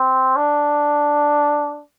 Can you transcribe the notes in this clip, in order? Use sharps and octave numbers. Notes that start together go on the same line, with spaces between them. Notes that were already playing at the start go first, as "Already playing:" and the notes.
Already playing: C4
D4